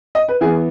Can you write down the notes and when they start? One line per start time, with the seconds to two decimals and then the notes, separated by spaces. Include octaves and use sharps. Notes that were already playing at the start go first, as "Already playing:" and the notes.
0.15 D#5
0.28 B4
0.41 E3 B3 G#4